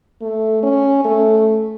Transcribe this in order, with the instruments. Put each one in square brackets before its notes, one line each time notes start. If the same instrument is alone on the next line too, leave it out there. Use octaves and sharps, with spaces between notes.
[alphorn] A3
C#4
A3